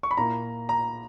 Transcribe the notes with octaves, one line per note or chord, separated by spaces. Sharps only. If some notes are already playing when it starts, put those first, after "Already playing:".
C#6
B5
A#2 A#3 E4 A#5
A#5